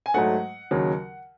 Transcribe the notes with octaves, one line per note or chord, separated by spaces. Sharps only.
G#5
G#2 F#3 A3 F#5
D#2 C#3 F#3